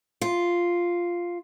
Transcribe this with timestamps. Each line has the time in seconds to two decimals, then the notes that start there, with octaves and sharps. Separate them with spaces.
0.21 F4